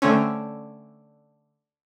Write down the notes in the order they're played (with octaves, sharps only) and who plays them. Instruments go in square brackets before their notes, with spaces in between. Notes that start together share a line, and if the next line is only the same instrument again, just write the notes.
[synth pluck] D3 A3 C4 C#4